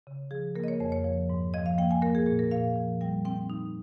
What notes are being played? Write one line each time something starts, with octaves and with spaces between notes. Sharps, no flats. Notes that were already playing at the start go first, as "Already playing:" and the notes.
C#3
F3 G#4
A#3 A#4
D#5
C#5
F2 C5
C#5
F3
G#2
F3 D#5
F5
A#3 G5
G#5
A#3 A#4
G#4
A#2 G#4
A#4
A#2 F5
F3
G3 G5
C4 G5
D#4